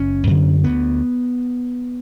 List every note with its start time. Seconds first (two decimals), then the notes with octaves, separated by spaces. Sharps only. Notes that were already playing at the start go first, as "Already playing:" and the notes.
Already playing: F#1 C#4
0.27 F#2 D3
0.64 D2 B3